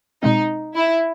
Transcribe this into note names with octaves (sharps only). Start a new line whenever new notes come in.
B2 G#3 C4 D#4
E4